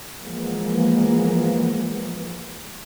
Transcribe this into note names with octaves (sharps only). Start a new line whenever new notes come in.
E3 F3 G#3 A#3 B3